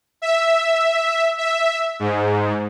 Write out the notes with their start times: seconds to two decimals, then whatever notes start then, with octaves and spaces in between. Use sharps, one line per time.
0.22 E5
1.38 E5
2.00 G#2